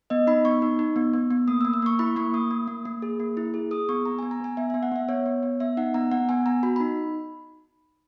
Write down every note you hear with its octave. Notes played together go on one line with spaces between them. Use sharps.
B3 D#5
D#4 B5
B3 C#6
D#4
D#4
B3
B3
B3
A#3 D#6
E6
A#3
E6
A#3 C#6
E4 B5
A#3 C#6
A#3 D#6
A#3
A#3
A#3
G#4
A#3
E4
G#4
G#4 D#6
B3 C#6
B3 A#5
B3 G#5
A#5
B3 G#5
B3 E5
B3 E5
F#5
B3 E5
B3 C#5
B3
B3
B3 E5
D#4 F#5
B3 A#5
B3 F#5
B3 G#5
B3 A#5
F#4 B5
D#4 B5